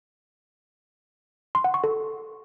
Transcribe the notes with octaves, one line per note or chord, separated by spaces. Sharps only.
C6
F#5
C#6
A4